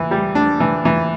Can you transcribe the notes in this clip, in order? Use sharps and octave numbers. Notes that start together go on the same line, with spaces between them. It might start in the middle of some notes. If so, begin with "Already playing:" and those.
Already playing: E3
G3
D4
E3
E3